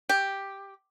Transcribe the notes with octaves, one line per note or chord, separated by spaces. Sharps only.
G4